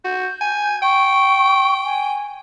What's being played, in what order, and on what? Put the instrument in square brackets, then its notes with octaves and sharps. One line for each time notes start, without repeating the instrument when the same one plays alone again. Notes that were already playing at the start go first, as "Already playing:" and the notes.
[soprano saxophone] F#4 [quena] G6
[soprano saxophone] G#5
[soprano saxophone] G5 [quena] C#6
[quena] G#5